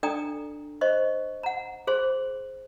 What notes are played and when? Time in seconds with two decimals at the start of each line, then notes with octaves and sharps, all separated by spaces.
0.03 D4 A4 D5 G5 A#5 D#6
0.81 C5 D#5 C#6
1.43 F#5 A#5
1.87 G#4 C5 C6